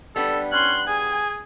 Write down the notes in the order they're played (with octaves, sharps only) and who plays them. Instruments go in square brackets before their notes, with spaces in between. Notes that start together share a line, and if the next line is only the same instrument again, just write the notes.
[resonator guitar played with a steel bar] G3 B3 D4 [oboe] A4
[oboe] C#4 [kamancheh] C6 F#6
[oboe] G#4 [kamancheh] G#5